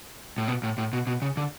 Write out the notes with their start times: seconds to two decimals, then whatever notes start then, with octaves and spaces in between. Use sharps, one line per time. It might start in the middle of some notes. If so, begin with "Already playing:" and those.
0.38 A2
0.48 B2
0.63 A2
0.78 A2
0.93 B2
1.07 B2
1.22 C#3
1.37 D3